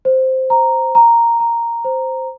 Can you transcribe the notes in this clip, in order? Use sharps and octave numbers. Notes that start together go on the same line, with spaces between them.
C5
A#5
A#5
A#5
C5